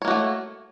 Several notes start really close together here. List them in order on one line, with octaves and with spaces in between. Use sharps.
C#5 A#3 F#4 A3